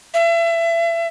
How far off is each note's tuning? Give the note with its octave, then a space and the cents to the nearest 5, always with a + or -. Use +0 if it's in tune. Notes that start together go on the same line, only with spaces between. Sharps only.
E5 +35